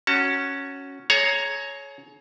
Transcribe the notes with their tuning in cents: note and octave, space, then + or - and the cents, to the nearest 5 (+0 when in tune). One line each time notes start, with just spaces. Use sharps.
C#4 +0 F#4 +0 A5 +40
G#4 +40 C#5 +0 A#5 +0